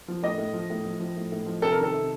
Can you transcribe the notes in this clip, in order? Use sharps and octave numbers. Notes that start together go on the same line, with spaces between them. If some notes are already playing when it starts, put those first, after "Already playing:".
F3
A2 D#5
A2
F3
A2
F3
F3
A2
A2
F3
C3 A4
A#4
D#3 A4
C3